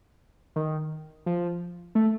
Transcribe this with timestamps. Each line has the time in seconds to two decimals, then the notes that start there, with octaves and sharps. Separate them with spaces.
0.56 D#3
1.26 F3
1.95 A3